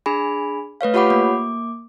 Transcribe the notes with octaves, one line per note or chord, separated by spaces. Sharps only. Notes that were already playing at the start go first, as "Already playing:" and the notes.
D4 G#4 G#5 B5
A3 B4 C#5 F5
F4 G4 C#5 F#5 B5 D6
A#3 D6